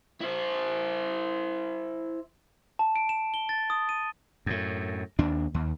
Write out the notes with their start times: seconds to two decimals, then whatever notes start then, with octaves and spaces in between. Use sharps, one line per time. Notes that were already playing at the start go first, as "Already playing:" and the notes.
0.21 E4 C5
2.79 A5
2.96 D7
3.09 E7
3.34 G7
3.49 A6
3.70 D#6
3.89 D#7
4.46 F#2 A2
5.19 D#2 D4
5.54 D#2